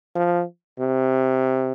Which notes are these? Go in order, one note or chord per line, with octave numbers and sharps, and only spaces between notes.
F3
C3